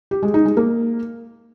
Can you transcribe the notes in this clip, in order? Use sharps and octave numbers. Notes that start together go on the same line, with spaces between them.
G4
G#3
D#4
G#3
A#3